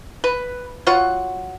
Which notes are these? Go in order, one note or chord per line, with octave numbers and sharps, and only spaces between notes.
B4
F#3 F4 C#5 F#5